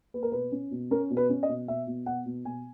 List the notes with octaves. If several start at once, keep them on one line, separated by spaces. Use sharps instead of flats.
A#3 B4
A#4
B2 B4
C#4
B2
C#4 A#4
B2
B4
C#4
D#5
B2
B2 E5
B2
B2 F#5
B2
B2 G#5